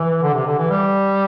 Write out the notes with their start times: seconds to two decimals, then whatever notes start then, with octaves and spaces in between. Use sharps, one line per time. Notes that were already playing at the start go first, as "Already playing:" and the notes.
Already playing: E3
0.22 D3
0.34 C3
0.46 D3
0.58 E3
0.70 G3